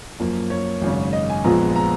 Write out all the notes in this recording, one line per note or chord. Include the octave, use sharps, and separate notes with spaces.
F#2 F3 A#3
C#5
G#1 F#2 C#3
D#5
G#5
A#1 A#2 F3 G#3 B3 A#5
A#5